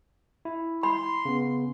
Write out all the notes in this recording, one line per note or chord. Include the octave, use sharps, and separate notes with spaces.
E4
B5 C6
C#3 B3